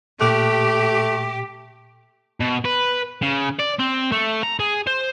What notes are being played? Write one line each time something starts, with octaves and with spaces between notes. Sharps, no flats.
A#2 A3 G4 D6 F#6
B2
B4
C#3
D5
C4
A3
A#5
G#4
C5